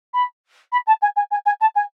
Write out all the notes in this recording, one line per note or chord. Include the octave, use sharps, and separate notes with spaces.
B5
B5
A5
G#5
G#5
G#5
G#5
A5
G#5